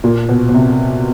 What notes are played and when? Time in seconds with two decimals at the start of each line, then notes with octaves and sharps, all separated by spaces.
0.04 A#2
0.29 B2
0.49 B2
0.54 C3